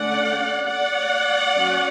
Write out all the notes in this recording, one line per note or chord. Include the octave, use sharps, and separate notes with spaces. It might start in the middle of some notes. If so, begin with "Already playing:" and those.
Already playing: D3 A3 C#4 D5 F#5
D5 F#5
F#3 C#4